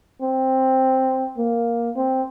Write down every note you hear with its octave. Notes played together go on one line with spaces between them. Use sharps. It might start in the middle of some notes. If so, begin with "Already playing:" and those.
C4
A#3
C4